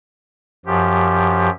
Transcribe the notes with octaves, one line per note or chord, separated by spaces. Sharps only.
F#2 F3 G4